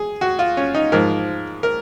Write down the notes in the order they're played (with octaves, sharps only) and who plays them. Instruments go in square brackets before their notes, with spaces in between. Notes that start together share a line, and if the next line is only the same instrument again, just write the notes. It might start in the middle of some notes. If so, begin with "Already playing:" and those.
Already playing: [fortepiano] G#4
F#4
F4
C#4
D#4
G#2 F3 A#4
A#4